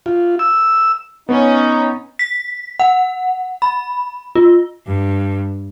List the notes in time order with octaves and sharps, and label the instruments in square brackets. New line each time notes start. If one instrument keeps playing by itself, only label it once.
[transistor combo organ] F4
E6
[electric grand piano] B3 [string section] C#4 [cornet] D#4
[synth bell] B6
F#5
B5
F4
[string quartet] G2